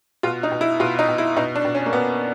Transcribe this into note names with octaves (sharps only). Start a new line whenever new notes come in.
B2 F4
D#4
B2
E4
B2 F4
D#4
B2
E4
B2 D#4
D4
B2
C#4
A#3
B2 B3